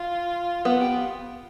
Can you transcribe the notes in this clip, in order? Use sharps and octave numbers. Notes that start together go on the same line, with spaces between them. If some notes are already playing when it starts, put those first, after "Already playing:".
Already playing: F4
B3 F4
G4
F4